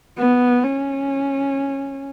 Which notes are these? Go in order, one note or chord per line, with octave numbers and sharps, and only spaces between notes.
B3
C#4